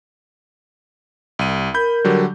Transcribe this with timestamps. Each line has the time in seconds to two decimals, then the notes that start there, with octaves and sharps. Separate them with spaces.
1.39 C2 D#7
1.74 A#4 B5 G6
2.04 D3 F#3 G3